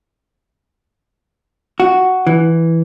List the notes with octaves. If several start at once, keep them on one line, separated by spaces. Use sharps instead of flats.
F#4
E3